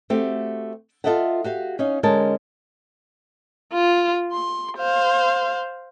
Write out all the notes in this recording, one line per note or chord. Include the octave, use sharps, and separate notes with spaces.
A3 C4 F#4 G4
F4 G4 A4 D#5 E5 F#5
F#4 G4 F5
C#4 D#4 F5
D3 G#3 C#4 D#4 A#4 A5
F4
C6
C5 F5